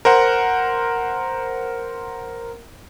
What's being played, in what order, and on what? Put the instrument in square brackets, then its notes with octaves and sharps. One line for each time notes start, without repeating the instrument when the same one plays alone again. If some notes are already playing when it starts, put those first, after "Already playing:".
[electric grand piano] A#4 C5 F#5